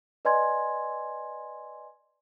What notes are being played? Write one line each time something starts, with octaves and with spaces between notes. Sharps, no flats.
B4 D5 D#5 G#5 C6 G#6